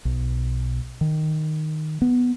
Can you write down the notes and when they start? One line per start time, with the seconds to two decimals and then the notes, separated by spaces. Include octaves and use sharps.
0.05 B1
1.01 D#3
2.02 B3